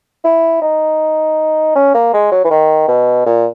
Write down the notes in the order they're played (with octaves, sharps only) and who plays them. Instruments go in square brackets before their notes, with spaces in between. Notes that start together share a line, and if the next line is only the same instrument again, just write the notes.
[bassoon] E4
D#4
C#4
A#3
G#3
F#3
E3
D#3
B2
A#2